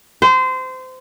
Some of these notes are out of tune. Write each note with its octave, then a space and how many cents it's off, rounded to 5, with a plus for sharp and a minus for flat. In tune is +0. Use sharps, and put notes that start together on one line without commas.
C5 -25